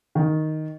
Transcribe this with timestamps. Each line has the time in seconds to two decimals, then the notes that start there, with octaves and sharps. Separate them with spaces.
0.15 D#3